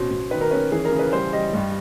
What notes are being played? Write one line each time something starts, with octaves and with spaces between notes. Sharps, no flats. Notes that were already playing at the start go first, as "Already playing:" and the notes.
Already playing: B2 C#4 C5
B2
D#3 B4
A#4
C#4 B4
E3 G#4
A#4
C#3
B4
G3 C5
G3 D#5
G2